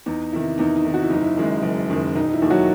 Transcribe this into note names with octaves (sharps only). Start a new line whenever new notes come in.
E2 D#4
C3 D#3 E4
E2 D#4
D#4
C3 D#3
F#4
E4
F#1 D#4
E4
F#2 D#3 G#3
F#1
F#2 D#3 G#3
E1 D#4
E4
D#2 D#3
F#3 F#4